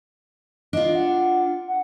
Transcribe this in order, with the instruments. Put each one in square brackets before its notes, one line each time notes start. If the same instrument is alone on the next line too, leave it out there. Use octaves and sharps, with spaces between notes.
[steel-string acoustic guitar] D4 F4 [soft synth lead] D#5
[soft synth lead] F#5
F#5